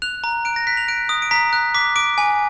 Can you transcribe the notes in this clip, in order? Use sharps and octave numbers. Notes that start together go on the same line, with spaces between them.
F#6 F7
A#5
F#6 D7
A#6
F#6 B6
F7
F#6 D7
D#6
D7
A#5 B6
F#6
D6 B6
D6 D7
G#5